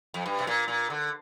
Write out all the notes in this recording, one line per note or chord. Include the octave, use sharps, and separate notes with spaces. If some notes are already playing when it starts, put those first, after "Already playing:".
F2
G2
C3
A#2
A#2
D3